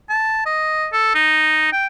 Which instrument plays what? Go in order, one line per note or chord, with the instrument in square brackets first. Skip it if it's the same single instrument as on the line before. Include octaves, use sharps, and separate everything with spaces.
[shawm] A5
D#5
A4
D#4
G5